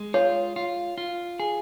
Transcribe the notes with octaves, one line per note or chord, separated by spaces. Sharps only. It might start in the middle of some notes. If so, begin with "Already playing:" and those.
Already playing: G#3
F4 C#5
F4
F4
G#4